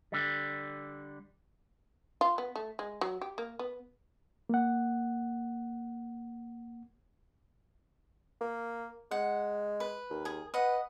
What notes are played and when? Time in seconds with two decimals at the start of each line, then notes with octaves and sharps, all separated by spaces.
0.12 D3 G3
2.21 F4
2.38 B3
2.56 A3
2.79 G#3
3.01 F#3
3.21 G4
3.38 A#3
3.59 B3
4.49 A#3 F#5
8.41 A#3
9.11 G#3 F#5
9.80 B4
10.10 D#2
10.25 G#4
10.54 B4 D#5 F#5